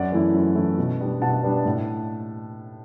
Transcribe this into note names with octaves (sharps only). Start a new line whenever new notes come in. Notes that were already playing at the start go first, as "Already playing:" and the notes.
Already playing: F#2 D5 F#5
E3 A3 E4
F#2
E3 A3 E4
B2
G3 B3 D4
B2 F#5 A5
G3 B3 D4
A2